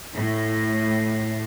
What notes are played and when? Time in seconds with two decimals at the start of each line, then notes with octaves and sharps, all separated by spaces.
0.14 A2